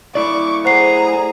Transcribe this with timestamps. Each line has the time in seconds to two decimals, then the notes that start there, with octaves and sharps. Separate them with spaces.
0.15 A3 E4 D5 C#6 D6
0.65 G#4 C5 F#5 A#5 C7